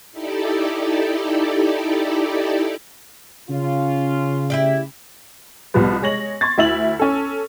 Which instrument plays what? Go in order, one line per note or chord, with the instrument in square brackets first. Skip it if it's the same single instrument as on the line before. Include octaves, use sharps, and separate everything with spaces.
[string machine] D#4 E4 G4 A4 D5
[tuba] C#3 [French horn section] C#4 F4
[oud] E4 G4 D5
[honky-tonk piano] C2 B2 F3 G3 B3
G#3 C#5 A#6 F#7
C6 C#6 G#6 A6
D2 E4 E6 F#7
C#4 A4